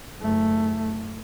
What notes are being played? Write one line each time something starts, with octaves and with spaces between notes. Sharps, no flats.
F#1 A3